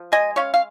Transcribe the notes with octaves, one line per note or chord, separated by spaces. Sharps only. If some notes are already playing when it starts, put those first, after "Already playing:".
Already playing: F3
G#3 D#5 G#5
C#4 C#5 F5
F5